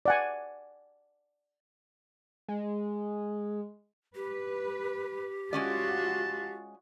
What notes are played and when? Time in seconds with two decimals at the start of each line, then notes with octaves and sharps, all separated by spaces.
0.06 D5 F#5 G#5
2.48 G#3
4.15 G4 B4
5.53 G#3 C#4 F4 F#4 D5 A5